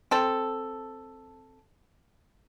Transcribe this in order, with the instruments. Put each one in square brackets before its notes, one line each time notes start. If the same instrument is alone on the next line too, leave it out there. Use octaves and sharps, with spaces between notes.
[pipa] C4 A4